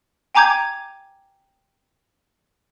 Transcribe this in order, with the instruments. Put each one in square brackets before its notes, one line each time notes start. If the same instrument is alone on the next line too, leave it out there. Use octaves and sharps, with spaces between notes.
[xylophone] G5 G#5 A#5 D6 G6 G#6